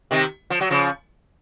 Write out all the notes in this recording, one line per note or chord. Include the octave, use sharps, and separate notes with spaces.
C3 D#3
F3
F#3
C#3 F3